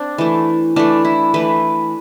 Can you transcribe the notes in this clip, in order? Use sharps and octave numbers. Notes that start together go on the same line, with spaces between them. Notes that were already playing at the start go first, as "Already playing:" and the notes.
Already playing: C4 D4
E3 A3
E3 A3 D4
E4
E3 A3 B4